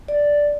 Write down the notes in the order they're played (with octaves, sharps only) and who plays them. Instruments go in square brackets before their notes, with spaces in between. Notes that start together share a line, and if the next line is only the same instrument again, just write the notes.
[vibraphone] D5